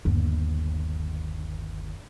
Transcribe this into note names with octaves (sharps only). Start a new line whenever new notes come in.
G1 D#2